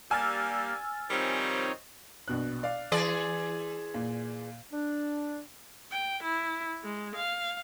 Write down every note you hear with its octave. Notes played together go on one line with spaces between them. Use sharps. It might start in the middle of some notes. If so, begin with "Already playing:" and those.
G3 A#3 D4 G4 G#5 E6 F6 A6
D#3 F3 G3 C4 D#4 C#5
A#1 B2 F#6
D5 F5
E3 G#4 D5 C7
A#2
D4
G5
E4
G#3
F5